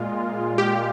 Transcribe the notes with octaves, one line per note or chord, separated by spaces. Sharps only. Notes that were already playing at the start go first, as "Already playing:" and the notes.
Already playing: A#2 G#3 F4
G4